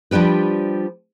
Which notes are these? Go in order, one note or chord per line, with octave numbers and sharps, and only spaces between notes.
F3 G3 D4 G4 B4